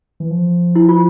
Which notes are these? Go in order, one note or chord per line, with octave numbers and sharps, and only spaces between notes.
E3
F3
E4
F4